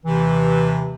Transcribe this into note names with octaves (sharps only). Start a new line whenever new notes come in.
D#2 C3 E3